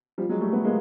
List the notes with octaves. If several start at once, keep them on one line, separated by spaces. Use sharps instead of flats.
F3 G3
F#3 G#3
G3 A3
A3 B3
G#3 A#3